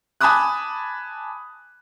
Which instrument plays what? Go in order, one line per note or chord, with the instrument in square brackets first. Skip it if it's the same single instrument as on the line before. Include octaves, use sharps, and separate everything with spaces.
[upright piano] G#5 A5 B5 D6 D#6 F#6